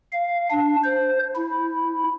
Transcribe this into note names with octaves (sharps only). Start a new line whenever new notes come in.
F5
D4
C5
E4